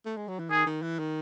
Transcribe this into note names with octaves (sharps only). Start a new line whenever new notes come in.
A3
G#3
F#3
E3
D#3 G#4
D#3
E3
D#3